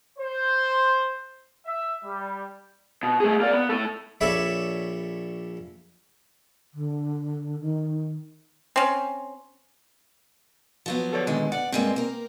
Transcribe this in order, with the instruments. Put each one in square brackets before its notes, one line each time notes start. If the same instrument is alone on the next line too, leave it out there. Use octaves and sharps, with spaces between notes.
[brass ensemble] C5
E5
G3
[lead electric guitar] B2
A3 G#4
A#3 D5
B3
A2 A4
[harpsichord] A#1 A4 C#5 D5 E5 B5
[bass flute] D3
D#3
[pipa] C4 C#4
[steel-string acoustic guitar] F3 F#3 B3
[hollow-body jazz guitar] A4 C#5 D5
[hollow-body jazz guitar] A#2 D3 D#3 [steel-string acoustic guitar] G#3
[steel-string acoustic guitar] D5 [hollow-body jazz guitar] F#5
[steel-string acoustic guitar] G2 G#3 A#3 [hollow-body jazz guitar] C4
[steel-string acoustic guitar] A#3 A#4